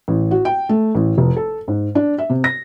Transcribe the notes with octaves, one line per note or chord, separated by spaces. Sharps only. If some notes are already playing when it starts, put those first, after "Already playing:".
A1
F#4
G5
A3
A1
F1
A4
G#2
D4
E5
C3
A#6